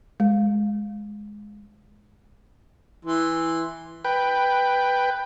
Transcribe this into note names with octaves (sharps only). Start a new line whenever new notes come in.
G#3
E3 C6
B4 G5